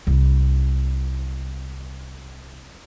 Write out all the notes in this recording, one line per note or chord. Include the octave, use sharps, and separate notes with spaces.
C2 E4